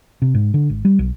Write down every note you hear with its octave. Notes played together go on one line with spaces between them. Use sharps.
C3
G#2
D3
G#1
G3
B1